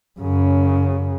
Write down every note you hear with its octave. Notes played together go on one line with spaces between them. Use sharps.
F#2 C#3